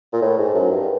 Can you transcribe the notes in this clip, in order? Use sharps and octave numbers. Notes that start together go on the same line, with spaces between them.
A#2
A2
G#2
F#2
G2